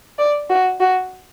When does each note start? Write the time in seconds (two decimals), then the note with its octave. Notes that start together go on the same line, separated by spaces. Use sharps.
0.19 D5
0.50 F#4
0.80 F#4